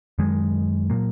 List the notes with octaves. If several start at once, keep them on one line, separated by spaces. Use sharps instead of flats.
F#2 D#3 G#3
A#2 F#3 A#3